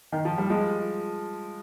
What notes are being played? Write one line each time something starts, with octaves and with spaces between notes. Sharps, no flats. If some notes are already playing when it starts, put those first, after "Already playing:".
D#3
F3
G3
F3 G#3